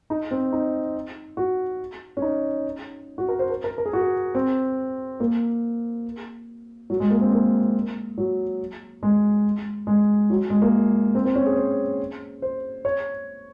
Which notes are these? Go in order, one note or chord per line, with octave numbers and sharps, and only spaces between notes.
D#4
C4
D#4
F#4
C#4
D#4
F#4
A#4
C5
A#4
A#4
A#4
G#4
F#4
G#4
C4
A#3
F#3
G#3
A#3
C4
A#3
F#3
G#3
G#3
F#3
G#3
A#3
C4
C4
C#4
G#4
C5
C5
C#5